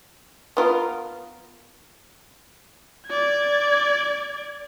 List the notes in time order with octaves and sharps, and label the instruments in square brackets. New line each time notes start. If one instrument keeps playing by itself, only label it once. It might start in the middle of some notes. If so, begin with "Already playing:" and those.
[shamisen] B3 F4 A#4
[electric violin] D5 G#6